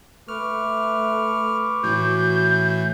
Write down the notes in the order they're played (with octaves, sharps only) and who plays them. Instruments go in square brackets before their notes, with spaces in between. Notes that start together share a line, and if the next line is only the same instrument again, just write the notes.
[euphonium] A3 [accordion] B4 C#6 D6 [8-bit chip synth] F6
[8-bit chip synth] A2 E3 [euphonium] F#4 [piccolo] G6